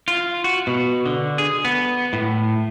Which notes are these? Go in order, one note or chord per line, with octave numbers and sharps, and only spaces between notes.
F4
F#4
B2
D3
G#4
B3
A2